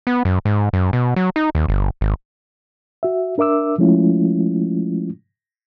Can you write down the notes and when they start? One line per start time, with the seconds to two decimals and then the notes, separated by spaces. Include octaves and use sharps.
0.07 B3
0.25 F#2
0.45 G#2
0.73 F#2
0.93 B2
1.16 F#3
1.36 D#4
1.55 D#2
1.68 G1
2.01 G#1
3.03 F#4 E5
3.38 D4 A#4 E5 D6 E6
3.78 F3 G#3 A3 C#4 E4 F4